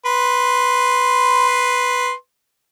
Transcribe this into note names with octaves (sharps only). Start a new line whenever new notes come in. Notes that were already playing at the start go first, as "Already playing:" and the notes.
B4 C6